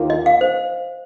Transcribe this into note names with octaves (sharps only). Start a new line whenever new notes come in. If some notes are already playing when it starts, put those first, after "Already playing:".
Already playing: D#2 D#3 A#3 F4
D#5
F5
C5